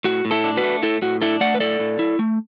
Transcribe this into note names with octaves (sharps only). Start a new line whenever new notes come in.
A2 F#4
A2
E4 A4
D4
F#4 B4
A3
A2 E4 A4
A2 F#4
D4 E4 A4
A3 D5 F#5
B4
A2 A4 D5
A2
E4
A3